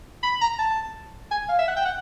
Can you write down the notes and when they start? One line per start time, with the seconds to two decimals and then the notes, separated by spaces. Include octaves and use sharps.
0.23 B5
0.41 A#5
0.59 A5
1.31 G#5
1.49 F5
1.59 E5
1.68 F#5
1.76 G5
1.85 F#5